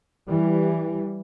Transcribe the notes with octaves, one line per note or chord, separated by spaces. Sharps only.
E3 G3